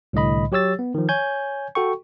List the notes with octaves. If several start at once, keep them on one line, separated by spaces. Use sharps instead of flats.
C2 A2 D3 D#5 B5
F#3 G4 C#5 E6 A6
B3
D#3 F3
C#5 G#5 G6 G#6
F#4 A4 G5 C#6